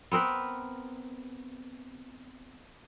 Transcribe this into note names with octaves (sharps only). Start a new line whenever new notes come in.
B3 C4 A#4 B4